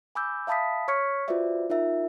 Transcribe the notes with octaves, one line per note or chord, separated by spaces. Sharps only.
G#5 B5 D6 E6 G6
E5 F5 A5 B5 D#6 B6
C#5 C#6 F6 G#6 B6 C#7
F4 F#4 B4 C5 D5 E5
D#4 F4 A#4 E5